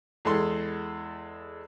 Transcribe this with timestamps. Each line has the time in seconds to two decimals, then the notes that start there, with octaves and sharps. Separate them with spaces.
0.25 E2 G#3 A4 C6